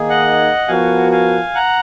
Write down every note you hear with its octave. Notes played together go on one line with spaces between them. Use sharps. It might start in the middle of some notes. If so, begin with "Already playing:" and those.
Already playing: D#3 A#3 D#4 G#4
D#5 F#5
F3 B3 F#4 A#4 F5 G#5
F5 G#5
F#5 A#5